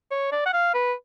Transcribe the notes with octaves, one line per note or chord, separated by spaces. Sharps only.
C#5
D5
F#5
F5
B4